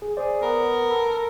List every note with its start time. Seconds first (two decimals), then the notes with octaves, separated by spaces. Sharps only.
0.02 G#4
0.17 G#4 C5 D5
0.42 B3 A#4
0.91 A4 B5